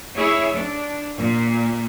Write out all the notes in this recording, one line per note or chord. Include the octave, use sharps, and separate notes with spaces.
E4 G#4 C#5 E5
D4
A#2